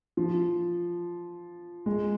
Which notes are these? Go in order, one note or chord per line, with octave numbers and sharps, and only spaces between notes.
F3
G#3